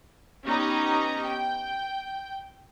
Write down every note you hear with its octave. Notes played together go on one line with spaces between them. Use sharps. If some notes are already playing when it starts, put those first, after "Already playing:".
B3 C#4 D#4 G4 D#5 A#5
G5